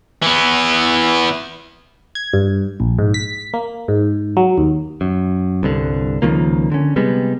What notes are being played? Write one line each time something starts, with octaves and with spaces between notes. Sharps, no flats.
E3 B3
G#6
G2
A#1
G#2
B6
A#3
G#2
F#3
D#2
F#2
C2 G2 D3
C#2 D#3 F3 A#3
D3 C#4
C3 G3 G#3 B3